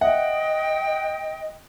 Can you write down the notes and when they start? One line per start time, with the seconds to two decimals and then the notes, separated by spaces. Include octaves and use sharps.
0.01 D#5 E5 F#5 G5